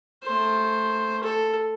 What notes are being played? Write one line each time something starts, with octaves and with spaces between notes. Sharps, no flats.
A3 C5
A4